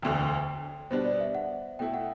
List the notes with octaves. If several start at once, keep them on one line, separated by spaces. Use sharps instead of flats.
E1 D2 D3 G5
B2 G3 B3 D4 C5
D5
E5
F#5
B2 A3 E4 G5
F#5